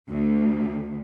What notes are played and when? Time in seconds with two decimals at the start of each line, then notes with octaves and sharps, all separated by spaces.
0.10 D2